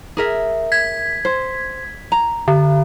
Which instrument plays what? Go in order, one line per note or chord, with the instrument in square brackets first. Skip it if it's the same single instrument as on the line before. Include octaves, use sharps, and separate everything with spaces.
[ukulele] G#4 A#4 E5
[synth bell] G#6 B6
[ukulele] C5
A#5
[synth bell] D3